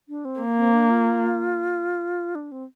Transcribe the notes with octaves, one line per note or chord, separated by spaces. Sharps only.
D4
C4
A#3
C4
D4
F4
D4
C4